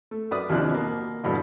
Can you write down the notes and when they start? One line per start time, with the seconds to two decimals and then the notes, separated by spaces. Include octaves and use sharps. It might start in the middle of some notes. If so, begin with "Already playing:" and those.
0.11 A3
0.31 F#2 B4 D5 D#6
0.50 D#2 C3 E3 F3 D4 F#6
0.71 B2 A#3
1.24 E2 G2 B2 D3